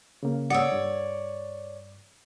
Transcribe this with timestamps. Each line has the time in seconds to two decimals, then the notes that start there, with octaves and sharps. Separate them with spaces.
0.23 C#3 A#3
0.50 C#5 D5 F#5 D#6 E6
0.72 G2